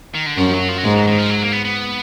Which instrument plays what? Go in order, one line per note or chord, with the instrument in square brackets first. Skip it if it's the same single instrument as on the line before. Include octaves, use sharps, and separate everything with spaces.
[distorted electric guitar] D#3
D3
[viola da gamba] F#2 [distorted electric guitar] F3
[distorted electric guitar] F#3
F3
F#3
[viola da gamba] G#2 [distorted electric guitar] G#3
[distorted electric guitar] F#3
D#3
F3
F#3
A#3
B3
B3